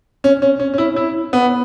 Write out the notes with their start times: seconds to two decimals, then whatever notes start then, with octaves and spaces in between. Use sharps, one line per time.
0.24 C#4
0.42 C#4
0.59 C#4
0.74 C#4
0.78 E4
0.96 E4
1.33 B3